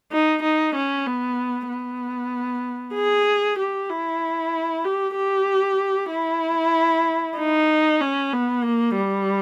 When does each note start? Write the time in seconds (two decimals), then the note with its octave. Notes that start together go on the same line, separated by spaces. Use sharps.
0.12 D#4
0.42 D#4
0.75 C#4
1.06 B3
1.69 B3
2.95 G#4
3.58 G4
3.90 E4
4.85 G4
5.16 G4
6.11 E4
7.38 D#4
8.00 C#4
8.32 B3
8.64 A#3
8.96 G3